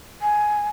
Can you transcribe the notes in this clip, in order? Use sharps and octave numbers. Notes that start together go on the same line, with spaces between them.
G#5